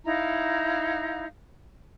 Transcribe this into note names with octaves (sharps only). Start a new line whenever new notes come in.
D#4 E4 F5 A#5